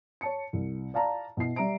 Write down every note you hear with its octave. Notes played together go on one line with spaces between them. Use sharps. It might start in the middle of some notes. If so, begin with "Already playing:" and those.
C#5 A5 C#7
C2
D5 F5 A5 A#5
B2 E4 C7
G3 D5 E5 A#5 D7